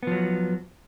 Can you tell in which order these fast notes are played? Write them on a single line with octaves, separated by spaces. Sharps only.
B3 F3 F#3